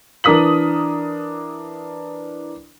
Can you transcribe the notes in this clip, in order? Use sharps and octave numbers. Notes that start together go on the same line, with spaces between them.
E3 D4 A#4 D#6 B6 F#7